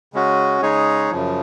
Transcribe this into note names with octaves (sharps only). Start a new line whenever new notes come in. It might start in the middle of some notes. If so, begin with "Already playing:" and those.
C#3 G#3 C#4 F#4
C#3 G#3 D#4 G#4 C#5
F#2 C#3 F3